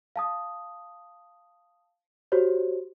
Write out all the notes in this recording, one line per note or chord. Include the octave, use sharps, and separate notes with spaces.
F5 A5 D#6
F#4 G4 C5 C#5